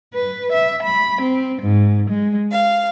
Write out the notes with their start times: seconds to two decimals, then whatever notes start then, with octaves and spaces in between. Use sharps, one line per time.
0.14 B4
0.53 E5
0.83 B5
1.21 C4
1.61 G#2
2.10 G#3
2.51 F5